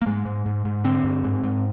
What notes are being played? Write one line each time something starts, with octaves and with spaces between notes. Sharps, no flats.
A#3
G#2 G#3
G#2
G#2
G#2
D3 C4
G2
G#2
G#2